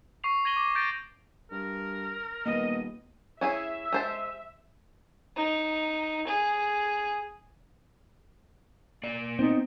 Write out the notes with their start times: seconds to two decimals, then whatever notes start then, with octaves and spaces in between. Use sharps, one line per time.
0.24 C#6 C7 F7
0.45 G#6 A#6 D#7 F#7 G7
0.57 D6
0.75 G6 A6 A#6 D7
1.51 G2 A#4
2.45 D#1 A#3 B3 D#5
3.41 C#4 E4 G#4 E5
3.92 G#3 C5 A5
5.37 D#4
6.27 G#4
9.03 A#3 D5
9.39 B3 C4 D#4